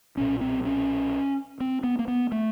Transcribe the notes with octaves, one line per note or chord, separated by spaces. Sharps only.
B1 A#2 C#4
C4
C#4
C4
B3
A#3
B3
A3